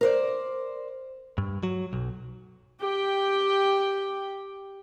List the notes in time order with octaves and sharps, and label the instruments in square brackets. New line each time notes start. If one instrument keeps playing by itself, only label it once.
[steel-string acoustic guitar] A#4 C5 D5
[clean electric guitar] G2
F#3
B1
[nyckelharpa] G4 G5